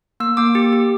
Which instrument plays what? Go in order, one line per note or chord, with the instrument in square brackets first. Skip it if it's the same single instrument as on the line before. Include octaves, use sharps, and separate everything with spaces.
[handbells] A#3 E6
A#3 D6
G4
G4